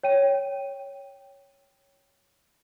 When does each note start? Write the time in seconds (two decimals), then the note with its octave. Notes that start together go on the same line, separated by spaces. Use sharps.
0.03 C#5 G5 D#7